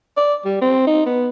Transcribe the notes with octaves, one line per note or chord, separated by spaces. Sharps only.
D5
G3
C4
D#4
B3